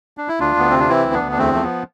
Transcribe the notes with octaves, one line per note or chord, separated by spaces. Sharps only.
D4
E4
D2 D4 F4
D2 B3
C3 C4
D4
E3 C4 E4
D2
B3 D4
D2
D4
E2 A3 C4
F3 A3
B3